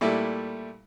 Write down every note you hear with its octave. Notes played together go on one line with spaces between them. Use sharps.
A#2 G3 A3 E4